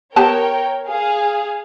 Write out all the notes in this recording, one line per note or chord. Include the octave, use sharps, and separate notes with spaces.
B3 G4 A#4 C#5 G5 A5
G#4 F5